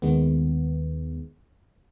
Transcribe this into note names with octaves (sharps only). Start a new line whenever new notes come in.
D#2 D#3 G#3 B3